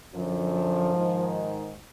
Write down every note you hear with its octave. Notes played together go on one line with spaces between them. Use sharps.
F#2 D3 F3
G#2 D#3